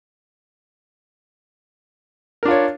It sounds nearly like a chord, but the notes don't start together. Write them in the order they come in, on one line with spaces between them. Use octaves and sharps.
A#4 D4 F4 C#5